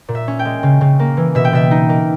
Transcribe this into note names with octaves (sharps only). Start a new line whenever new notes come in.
A#2
E5
C#4
G5
G#3
C#3
C#3
A#3
E3
B2 E5
G5
B2 E5
D#4
A#3